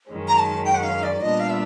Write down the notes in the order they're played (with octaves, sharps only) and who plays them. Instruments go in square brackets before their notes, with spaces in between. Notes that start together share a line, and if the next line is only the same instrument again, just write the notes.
[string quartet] F#2 D#3 G#3 C#4
[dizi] A#5
A5
G5
F#5
F5
D5
[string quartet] A#2 G3 B3 D4 F4 [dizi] D#5
[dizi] F5
E5